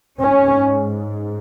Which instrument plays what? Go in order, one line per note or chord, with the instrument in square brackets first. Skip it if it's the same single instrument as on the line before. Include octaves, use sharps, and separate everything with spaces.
[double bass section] G#2 C#4